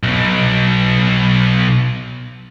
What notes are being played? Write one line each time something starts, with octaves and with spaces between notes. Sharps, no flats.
B1 B2